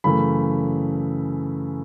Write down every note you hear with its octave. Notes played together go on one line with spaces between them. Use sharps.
F#2 C#3 E3 A3 B5